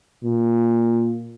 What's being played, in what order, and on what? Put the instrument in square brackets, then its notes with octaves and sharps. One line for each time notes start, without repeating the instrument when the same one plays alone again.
[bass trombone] A#2